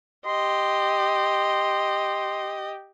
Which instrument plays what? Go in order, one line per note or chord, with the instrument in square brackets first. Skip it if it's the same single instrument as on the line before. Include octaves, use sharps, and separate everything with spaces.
[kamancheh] G4 D#5 [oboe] C6